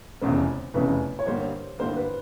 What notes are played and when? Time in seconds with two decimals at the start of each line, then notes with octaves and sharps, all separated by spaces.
0.21 F1 E2 C#3 C5
0.74 F1 E2 C#3 B4
1.19 C#5
1.26 G2 D3 G3 A#3 C5
1.79 G2 D3 G3 A#3 C5
1.96 B4